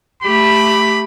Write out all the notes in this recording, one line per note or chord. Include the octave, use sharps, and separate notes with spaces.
A3 G4 B5